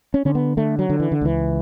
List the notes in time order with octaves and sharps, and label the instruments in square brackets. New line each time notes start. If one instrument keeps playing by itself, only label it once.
[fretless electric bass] C#4
D3 C#4
B3
D3 A3
F#3
D3
E3
D3
C#2 E3